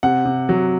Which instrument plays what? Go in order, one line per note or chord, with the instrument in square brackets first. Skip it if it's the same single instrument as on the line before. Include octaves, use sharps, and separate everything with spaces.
[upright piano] C3 F#5
C3
F#3